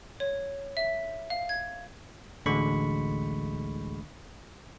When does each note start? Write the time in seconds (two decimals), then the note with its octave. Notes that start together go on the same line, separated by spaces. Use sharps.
0.20 C#5
0.77 E5
1.30 F5
1.49 G#6
2.46 A1 D2 D3 G#3 B5 C#6